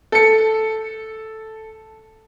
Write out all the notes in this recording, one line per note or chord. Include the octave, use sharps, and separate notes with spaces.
A4 C#7